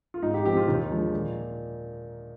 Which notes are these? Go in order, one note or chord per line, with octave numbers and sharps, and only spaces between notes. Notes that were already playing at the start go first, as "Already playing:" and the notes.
F4
G#2 D#4
G4
F3 C4 G4
F4
D#2 D#4
D3 F3 G#3
A#2